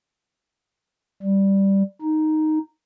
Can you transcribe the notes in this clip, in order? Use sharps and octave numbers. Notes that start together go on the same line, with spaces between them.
G3
D#4